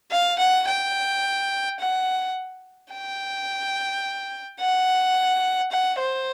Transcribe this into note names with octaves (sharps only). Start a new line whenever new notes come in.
F5
F#5
G5
F#5
G5
F#5
F#5
C5